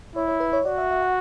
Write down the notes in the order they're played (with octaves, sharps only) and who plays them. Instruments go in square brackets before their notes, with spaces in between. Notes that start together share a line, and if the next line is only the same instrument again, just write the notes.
[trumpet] E4 [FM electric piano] C#5
[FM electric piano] C#5
B4
C#5
[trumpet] F#4 [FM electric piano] D5
[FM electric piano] E5
E5
F#5